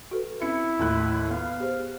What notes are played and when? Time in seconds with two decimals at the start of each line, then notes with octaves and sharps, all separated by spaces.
0.11 F#4 A4 B4
0.42 C4 C#4 E4 C#7
0.79 D#2 A2 F#6
1.31 B3 F5
1.60 G4 G#4 C5